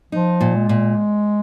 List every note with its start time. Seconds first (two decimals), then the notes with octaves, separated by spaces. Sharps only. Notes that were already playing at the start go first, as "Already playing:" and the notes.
0.12 F3 D#4
0.41 A#2
0.55 G#3
0.69 A#2